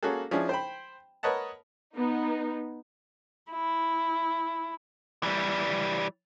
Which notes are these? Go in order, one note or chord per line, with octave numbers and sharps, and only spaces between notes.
A#3 C#4 F#4 G#4 A4
F3 C#4 D4 E4 G#4
C5 G5 B5
A#4 B4 C#5 D#5 F#5 A5
B3 D#4
E4
E3 G3